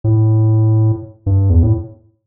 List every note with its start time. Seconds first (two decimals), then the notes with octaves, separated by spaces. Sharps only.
0.04 A2
1.26 G2
1.50 E2
1.63 A2